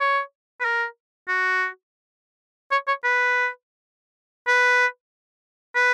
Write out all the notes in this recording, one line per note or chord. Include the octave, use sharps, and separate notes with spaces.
C#5
B4
A#4
F#4
C#5
C#5
B4
B4
B4